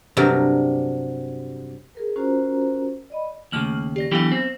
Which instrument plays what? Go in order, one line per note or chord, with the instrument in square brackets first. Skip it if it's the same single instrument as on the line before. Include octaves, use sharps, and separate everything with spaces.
[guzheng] G2 C3 F#3 A#4
[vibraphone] G#4 A#4 B4
C#4 F4 F#4 A#4 C5 A#5
D5 D#5 B5
[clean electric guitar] D#2 A2 C#3 [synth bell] A3 F6 F#7
[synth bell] G4 D5 A#6
[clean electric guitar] D3 E3 G4 [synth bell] F#3 B3 F5
[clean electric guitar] C4